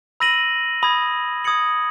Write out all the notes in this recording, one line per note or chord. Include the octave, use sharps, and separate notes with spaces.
B5 E6 A#6 D#7 F#7
B5 D#6 G#6
D#6 G#6 C#7 F#7